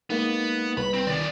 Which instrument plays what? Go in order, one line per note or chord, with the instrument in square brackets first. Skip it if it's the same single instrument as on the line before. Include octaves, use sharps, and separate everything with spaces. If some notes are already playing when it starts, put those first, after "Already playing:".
[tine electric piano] G#3 A#3 D#4 [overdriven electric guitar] B3
[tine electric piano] C2 B4 [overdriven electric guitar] B5
[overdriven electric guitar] C4
[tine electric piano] D#3 [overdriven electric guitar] B3 D5